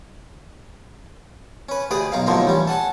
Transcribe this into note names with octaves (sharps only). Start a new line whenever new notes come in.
C#4 B4
D2 G4 G#4 B4 D5 D#6
B1 D#4 F5
D#2 A2 D3 F3 F#3 A#3
A1 G3 C#4
A4 F#5 G#5 A5